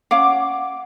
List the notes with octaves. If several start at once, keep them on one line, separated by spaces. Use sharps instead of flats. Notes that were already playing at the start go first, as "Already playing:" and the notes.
C#4 F5 F#5 D6